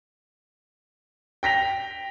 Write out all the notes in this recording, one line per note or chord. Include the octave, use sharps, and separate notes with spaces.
G5 A#6 B6 F7